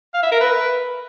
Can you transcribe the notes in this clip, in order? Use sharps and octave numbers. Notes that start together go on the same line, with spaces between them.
F5
E5
A#4
B4